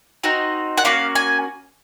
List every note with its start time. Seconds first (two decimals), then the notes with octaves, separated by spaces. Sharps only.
0.24 C4 D#4 F#4
0.78 F#5
0.85 A#3 C#4 F#4 F5
1.15 G#5